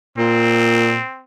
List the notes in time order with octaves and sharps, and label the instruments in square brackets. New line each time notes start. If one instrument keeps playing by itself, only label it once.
[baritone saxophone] A#2 [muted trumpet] C4